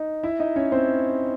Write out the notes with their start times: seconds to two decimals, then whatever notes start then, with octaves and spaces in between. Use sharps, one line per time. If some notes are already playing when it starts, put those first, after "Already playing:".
Already playing: D#4
0.23 E4 E5
0.40 D#4 D#5
0.56 C#4 C#5
0.72 C4 C5